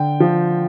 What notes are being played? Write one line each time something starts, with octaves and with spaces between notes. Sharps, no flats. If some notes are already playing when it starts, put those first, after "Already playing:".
Already playing: D3 G5
F3